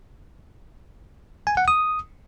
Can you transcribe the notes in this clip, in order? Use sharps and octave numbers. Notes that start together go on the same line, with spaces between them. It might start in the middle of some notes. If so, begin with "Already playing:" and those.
G#5
F#5
D#6